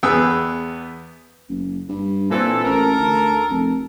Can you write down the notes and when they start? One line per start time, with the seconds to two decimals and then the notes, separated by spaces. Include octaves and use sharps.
0.03 E2 B3 G#4 G5 E6
1.49 F#1
1.89 G2
2.30 A#2 E3 C4 A4
2.64 A1 A4 A#4
2.98 D2
3.50 F1